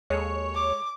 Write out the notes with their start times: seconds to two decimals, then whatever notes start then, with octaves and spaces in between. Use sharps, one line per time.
0.10 D#2 G#3 G#4 A4 C#5
0.55 D6